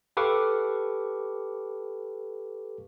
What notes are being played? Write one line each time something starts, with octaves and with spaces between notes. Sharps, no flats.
G4 A4 B4 F5 C#6 D6